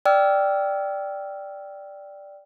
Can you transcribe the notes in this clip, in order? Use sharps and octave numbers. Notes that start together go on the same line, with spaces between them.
D5 G5 E6 F6